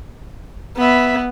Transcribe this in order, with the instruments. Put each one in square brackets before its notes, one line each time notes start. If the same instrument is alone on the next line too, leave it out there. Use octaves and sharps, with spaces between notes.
[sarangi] B3 [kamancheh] E5 B5